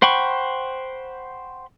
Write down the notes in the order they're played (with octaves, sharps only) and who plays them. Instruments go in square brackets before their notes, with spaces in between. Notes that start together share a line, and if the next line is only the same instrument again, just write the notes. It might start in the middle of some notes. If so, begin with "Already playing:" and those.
[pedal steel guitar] C5 F#5 G5 B5 C#6